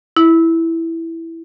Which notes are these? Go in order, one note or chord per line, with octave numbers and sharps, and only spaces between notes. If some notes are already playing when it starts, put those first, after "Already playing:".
E4